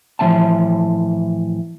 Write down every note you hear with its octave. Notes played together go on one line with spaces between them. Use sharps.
A2 E3 F3 C4 E5 A5